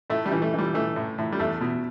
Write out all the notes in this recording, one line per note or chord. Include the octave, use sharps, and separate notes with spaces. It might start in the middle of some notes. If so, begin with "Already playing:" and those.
A2 A3
G3
E3
A3
E3 G3
E3 A3
A2
A2
G3
E2 A3
B2